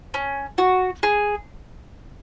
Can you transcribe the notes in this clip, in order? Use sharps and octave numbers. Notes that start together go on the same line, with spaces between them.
C#4
F#4
G#4